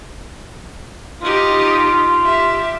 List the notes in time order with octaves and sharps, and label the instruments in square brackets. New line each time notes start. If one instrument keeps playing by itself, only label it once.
[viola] D#4 G4 [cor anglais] F4
[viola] G4 E5